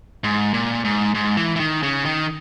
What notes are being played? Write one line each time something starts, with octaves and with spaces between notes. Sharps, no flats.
G#2
A#2
G#2
G#2
E3
E3
D#3
C#3
D#3